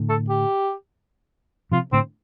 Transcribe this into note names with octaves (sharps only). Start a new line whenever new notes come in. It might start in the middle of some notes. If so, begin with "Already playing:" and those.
Already playing: A2 D3
A4
G4
C3 F3 F4
A2 D3 C4